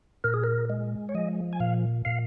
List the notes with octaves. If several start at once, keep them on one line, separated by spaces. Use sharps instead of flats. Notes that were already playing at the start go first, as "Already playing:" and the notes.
A#2 A#4
G#4
A#4
G#3
C#5
F3 D#5
G#5
A#2 F5
A#2 F5